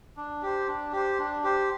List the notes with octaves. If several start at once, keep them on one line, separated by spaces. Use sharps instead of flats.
D4
G4 C5
D4
G4 C5
D4
G4 C5